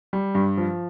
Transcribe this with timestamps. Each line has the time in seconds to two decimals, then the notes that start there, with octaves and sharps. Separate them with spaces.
0.13 G3
0.35 G2
0.57 F3